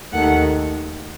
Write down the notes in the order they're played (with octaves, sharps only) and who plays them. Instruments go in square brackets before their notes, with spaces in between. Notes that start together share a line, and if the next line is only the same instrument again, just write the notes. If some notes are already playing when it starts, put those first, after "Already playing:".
[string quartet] D#2 D#3 A3 F#5